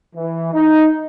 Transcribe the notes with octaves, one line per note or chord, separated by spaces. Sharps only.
E3
D#4